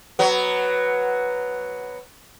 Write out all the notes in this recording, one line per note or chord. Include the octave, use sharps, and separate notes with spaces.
F#3 B3